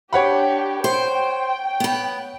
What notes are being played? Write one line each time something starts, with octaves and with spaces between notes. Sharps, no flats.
D4 G4 C#5 F#5 B5
C5 G5
B3 B4